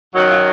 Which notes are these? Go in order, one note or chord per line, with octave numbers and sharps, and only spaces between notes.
F#2 D#3 F#3
F4